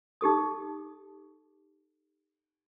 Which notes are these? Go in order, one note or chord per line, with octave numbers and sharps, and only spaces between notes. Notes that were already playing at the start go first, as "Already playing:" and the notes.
D#4 G4 A4 D#6